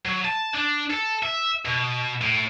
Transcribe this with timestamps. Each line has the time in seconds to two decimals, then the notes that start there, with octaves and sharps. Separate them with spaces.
0.05 F#3
0.25 A5
0.54 D4
0.90 A4
1.23 E5
1.65 B2
2.21 A2